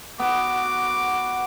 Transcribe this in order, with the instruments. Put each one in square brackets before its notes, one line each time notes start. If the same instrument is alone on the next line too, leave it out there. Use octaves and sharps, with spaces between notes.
[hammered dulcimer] B3 [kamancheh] F#4 D6